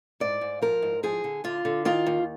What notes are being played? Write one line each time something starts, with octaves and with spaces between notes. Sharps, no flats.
G#2 D5
G#2
F3 A#4
G#2
F3 G#4
D3
D3 F4
D3
D#3 F4
D#2